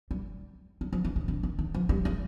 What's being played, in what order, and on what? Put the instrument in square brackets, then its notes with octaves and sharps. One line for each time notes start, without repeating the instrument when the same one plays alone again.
[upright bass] G3
G3
F3
E3
D#3
D3
D#3
D#3
F3
G3
G#3